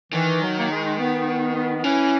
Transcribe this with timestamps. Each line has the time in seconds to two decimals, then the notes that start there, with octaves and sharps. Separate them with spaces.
0.13 D#3 E3
0.41 F#3
0.59 A#3
0.70 G#3
0.98 B3
1.27 B3
1.55 B3
1.77 B3
1.83 E3 C#4